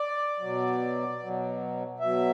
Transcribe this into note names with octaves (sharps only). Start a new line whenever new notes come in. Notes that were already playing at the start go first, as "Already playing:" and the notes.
Already playing: D5
B2 F#3
B2 F#3
B2 F#3 E5